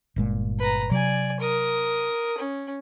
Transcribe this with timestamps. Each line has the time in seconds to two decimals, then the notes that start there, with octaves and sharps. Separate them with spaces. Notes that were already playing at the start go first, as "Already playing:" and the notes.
0.16 G1 A#2 G#3
0.59 B4 A#5
0.91 C3 F#3 D5 G#5
1.40 A#4 D#6
2.38 C#4